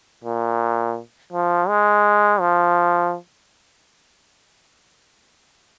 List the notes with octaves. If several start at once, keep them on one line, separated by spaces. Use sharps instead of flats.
A#2
F3
G#3
F3